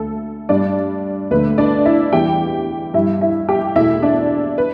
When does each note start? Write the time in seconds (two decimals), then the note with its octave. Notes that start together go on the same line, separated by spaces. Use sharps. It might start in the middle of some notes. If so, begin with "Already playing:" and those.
Already playing: D2 D3 A4
0.49 G2 G3 D4 D5
1.31 D2 D3 A3 B4
1.58 D4 D5
1.85 E4 E5
2.13 E2 E3 G3 G4 G5
2.94 G2 E4 E5
2.98 G3
3.21 E4 E5
3.49 G4 G5
3.75 E2 B2 A3 E4 E5
4.02 D4 D5
4.58 B4